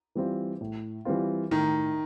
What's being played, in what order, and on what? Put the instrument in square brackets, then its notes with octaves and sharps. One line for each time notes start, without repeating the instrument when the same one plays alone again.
[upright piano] E3 G3 C4 F4
A2
E3 G3 C4 F4
[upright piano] A2 [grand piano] D#3